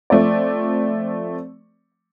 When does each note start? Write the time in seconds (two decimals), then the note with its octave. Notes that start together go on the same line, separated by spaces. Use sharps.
0.10 F3 A3 C4 D5